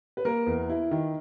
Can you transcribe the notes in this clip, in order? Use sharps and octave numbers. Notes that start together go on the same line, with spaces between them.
B4
A#3 A#4
E2
E4
D#3